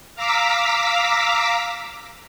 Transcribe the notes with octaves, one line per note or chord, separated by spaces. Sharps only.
F5 A#5 D6 E6 B6